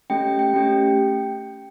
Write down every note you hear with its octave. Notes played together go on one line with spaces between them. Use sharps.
A3 C#4 G4 G5
G5
A3 C#4 G4